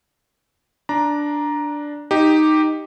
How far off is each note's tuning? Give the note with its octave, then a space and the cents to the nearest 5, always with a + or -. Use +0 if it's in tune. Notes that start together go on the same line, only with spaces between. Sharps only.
D4 +0 D5 +0 A#5 +10
D#4 +0 G4 +0